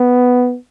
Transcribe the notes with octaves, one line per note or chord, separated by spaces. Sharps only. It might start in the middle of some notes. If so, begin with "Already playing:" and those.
Already playing: B3